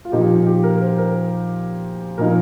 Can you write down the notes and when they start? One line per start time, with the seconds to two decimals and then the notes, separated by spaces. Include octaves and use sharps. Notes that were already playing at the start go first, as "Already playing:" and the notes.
0.05 F4
0.12 A#2 F3 D#4 G4
0.29 F4
0.46 G4
0.63 A#4
0.82 C5
0.98 A#4
2.18 A#2 F3 D#4 A#4